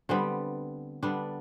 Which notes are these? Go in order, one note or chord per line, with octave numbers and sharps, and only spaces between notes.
D3 G3 B3 C4
D3 G3 B3 D4